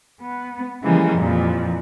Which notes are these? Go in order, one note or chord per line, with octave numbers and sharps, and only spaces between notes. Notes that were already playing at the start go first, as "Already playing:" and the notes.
B3
C#3 E3 F3 G3 G#3 A#3
F2 A#2 E3 F3